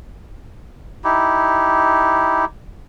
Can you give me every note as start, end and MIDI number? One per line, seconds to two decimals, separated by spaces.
1.04 2.45 63
1.04 2.45 64
1.04 2.45 67